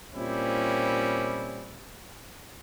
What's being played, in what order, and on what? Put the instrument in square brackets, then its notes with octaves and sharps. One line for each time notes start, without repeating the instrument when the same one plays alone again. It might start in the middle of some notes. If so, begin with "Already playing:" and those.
[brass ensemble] A#2 G3 C4 C#4 E4